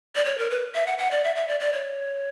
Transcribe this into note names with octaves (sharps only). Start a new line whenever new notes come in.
D5
C#5
A#4
B4
E5
F#5
F#5
D5
E5
E5
D5
D5
C#5